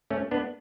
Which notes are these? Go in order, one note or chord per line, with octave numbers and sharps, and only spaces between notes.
A3 C#4
B3 D4